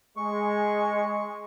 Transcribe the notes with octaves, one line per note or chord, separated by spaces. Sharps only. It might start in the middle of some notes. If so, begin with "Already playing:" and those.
G#3 C#6